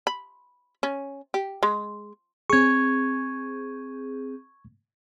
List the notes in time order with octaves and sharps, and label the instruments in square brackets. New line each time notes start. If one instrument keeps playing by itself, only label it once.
[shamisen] B5
C#4
G4
G#3
[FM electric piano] C4 G#4 [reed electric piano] C#6 G#6